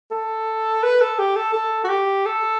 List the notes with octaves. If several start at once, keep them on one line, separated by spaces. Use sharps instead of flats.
A4
B4
A4
G4
A4
A4
F#4
G4
A4